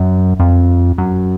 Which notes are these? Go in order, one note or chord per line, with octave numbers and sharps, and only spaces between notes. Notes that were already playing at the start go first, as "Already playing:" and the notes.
Already playing: F#2
F2
F#2